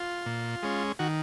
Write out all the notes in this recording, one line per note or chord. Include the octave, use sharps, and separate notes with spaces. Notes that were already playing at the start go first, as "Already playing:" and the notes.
Already playing: F4
A#2
G#3 C#4
D#3 F#4